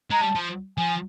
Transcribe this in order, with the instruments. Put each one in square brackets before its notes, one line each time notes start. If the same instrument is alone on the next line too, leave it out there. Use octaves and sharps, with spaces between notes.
[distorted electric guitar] G#3 [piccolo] A#5
[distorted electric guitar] G3 [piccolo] A5
[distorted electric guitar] F3
[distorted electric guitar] F3 [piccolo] G#5